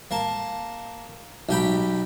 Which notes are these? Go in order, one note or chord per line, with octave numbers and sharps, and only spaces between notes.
A#3 A5
B1 G4 G5 B5